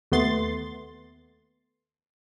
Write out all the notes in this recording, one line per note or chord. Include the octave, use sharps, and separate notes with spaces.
D#2 A3 B3 C6 A6